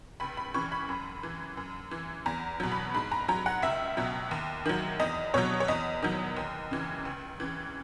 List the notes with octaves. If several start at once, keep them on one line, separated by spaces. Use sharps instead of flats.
C#2 B5
B5
C#3 E3 C#6
B5
F#2
E3
F#2
E3
E2 A#5
B2 F#3
B5
G#2 B5
A#5
F#3 A#5
F#5
C#2 E5
B2 F#3
D#2
D#3 F#3
E2 D#5
B2 F#3 C#5
C#5
E2 D#5
D#3 F#3
D#2
C#3 E3
C#2
C#3 E3